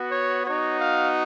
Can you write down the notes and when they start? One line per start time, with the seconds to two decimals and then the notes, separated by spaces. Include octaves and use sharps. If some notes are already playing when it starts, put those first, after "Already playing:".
Already playing: B3 F#4
0.11 C#5
0.45 B3 D#4 F#4 C#5
0.80 F5